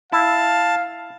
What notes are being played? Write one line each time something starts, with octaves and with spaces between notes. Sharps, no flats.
E4 F5 A5